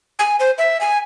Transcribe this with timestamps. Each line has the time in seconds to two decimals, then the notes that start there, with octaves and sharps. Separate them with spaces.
0.19 G#5
0.40 C5
0.58 E5
0.81 G#5